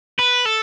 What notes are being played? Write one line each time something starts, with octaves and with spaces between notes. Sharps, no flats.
B4
A4